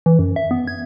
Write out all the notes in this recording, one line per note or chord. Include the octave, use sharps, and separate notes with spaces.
E3
F#2
E5
B3
G#6